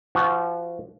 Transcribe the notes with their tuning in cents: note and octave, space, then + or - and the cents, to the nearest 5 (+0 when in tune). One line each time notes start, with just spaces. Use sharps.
F3 -30 F#4 +0